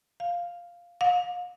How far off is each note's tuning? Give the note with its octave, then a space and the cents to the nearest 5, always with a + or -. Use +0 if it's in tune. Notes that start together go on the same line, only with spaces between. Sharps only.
F5 +0
F5 +35